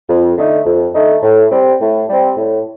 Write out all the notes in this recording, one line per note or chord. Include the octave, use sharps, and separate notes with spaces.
F2
D3 A3 D#4
F2
D3 A3 D#4
A2
G3 C4
A2
G3 C4
A2